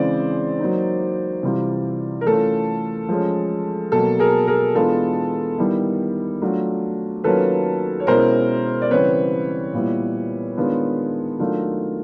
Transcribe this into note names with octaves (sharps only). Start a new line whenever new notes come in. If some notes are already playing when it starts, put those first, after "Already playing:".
Already playing: C#3 E3 G#3 C4 C5 D5
F#3 A#3 D#4
C3 E3 G3 C4 F4
A#4
E3 A3 C#4 F4 A4
F3 G#3 C#4
B2 F#3 A#3 A4
G#4 A#4
G#4 A#4
E3 G#3 B3 D4 F4 A4
D#3 G3 B3 E4
F#3 A3 D4 F4
D#3 F#3 A#3 C#4 F4 A4 B4
C#5
B2 G#3 C#4 E4 A#4 C5
D5
C#3 E3 G3 C4 B4 C#5
A#2 G3 B3 E4
D#3 G#3 B3 D4 F4
D#3 F#3 A3 D4 F4